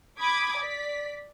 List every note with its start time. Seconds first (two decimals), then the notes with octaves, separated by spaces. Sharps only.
0.20 B5 D6 D#6 G#6 B6
0.57 D5 B6